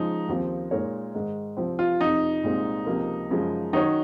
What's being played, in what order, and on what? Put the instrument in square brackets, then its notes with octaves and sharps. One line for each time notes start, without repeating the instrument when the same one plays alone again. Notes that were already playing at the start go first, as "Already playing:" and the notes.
Already playing: [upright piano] C#3 F3 G#3 [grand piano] D#4
[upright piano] D#2 C#3 F3 C4
A#2 G#3 D#4 A#4 C#5
G#2 D#3 G#3
C2 C3 F3 C4
[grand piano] F4
[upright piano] F2 C3 F3 [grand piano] D#4
[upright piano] C2 A#2 G#3 C4
C#2 C3 F3 A#3
F#2 C#3 F3 G#3
[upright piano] D#3 F#3 C#4 F#4 C#5 [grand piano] D#4